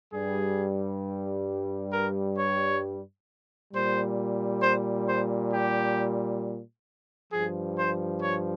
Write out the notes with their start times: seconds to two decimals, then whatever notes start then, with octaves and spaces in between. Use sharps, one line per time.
0.13 G2 G3 G#4
1.93 A#4
2.38 C#5
3.72 A#2 G3 C5
4.62 C5
5.08 C5
5.53 G4
7.32 G2 F3 G#4
7.77 C5
8.21 C#5